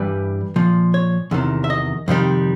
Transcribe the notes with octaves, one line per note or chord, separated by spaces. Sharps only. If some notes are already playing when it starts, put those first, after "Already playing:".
Already playing: G2 E3 G3 B4
A#2 F3
C#5
E2 C3 D#3
E5
D#5
F2 C3 D#3 G3